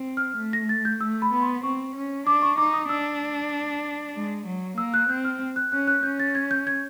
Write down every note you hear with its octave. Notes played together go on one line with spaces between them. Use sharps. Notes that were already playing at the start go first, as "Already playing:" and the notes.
Already playing: C4
F6
A3
A#6
A6
G6
A3 E6
B5
B3 B5
C6
C4 C#6
C#4
D4 D6
C#6
D#4 D6
D#6
D4 E6
G#3
F#3
A#3 E6
F#6
C4 G6
F6
F#6
C#4 F#6
F#6
C#4 G6
A6
G#6
G6
G#6